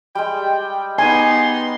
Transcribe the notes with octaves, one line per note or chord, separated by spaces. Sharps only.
G3 G#3 G5
B3 D#4 G#5 C6